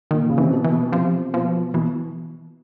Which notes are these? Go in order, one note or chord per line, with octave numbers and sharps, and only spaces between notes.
A#2 D#3
C#3
C3 E3
B2
E3
B2
C3 F3
B2 F3
B2 E3